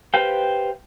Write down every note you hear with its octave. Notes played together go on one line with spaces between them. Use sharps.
G4 B4 C5 F5 G5